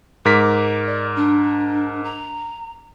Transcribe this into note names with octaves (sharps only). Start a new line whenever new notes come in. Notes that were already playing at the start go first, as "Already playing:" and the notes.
G#2 A#4 D6 B6
D5
D4
A#5